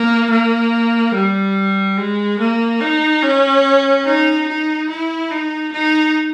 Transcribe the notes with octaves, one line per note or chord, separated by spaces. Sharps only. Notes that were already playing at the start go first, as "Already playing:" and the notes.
Already playing: A#3
A#3
G3
G#3
A#3
D#4
C#4
D#4
D#4
E4
D#4
D#4